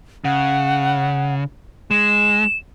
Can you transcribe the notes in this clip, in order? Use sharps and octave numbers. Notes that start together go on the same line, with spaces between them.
C#3 F#5
G#3 E7